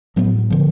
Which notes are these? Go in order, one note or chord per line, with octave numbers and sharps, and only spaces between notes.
A2 F#3 B3
D3 F3